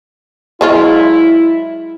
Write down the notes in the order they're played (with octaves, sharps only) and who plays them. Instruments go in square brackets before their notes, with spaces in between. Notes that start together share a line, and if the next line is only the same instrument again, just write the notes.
[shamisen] F#3 G#3 F4 [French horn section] E4